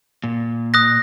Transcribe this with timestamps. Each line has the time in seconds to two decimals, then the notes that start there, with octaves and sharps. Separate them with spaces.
0.24 A#2
0.74 D#6 F#6 A#6